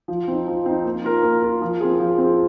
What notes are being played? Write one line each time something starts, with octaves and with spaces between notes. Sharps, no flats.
F3
C4 D#4
F3
C4 D#4
A#3
F4 A#4
A#3
F4 A#4
F3
C4 F4 G#4
F3
C4 F4 G#4